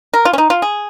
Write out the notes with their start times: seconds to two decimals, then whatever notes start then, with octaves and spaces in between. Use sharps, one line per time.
0.13 A#4
0.25 F4
0.33 C#4
0.38 D#4
0.50 F4
0.62 G#4